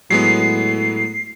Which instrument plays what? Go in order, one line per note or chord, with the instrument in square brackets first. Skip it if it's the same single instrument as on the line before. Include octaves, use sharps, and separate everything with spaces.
[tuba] A2 [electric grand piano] F#3 G#3 B3 [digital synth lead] C7